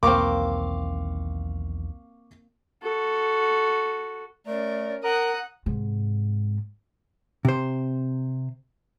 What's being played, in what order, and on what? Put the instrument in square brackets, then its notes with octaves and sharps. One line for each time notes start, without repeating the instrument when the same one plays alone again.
[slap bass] B1 E2 D#3 [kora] A#3 C4 [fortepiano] F5 C#6 D6
[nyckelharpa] F#4 A4
[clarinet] A3 [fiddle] C#4 A#4 [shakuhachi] D5
[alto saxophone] A#4 [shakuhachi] F#5 [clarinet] A#5 [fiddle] D#6 F#6
[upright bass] G#2 C3
[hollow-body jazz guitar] C3 C5